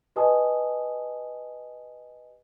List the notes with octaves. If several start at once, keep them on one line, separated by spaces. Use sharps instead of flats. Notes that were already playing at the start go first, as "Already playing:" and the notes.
G4 B4 D#5 G#5 A5 D#6